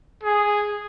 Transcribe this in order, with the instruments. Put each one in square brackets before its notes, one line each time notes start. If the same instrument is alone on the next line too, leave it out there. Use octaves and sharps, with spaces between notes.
[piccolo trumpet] G#4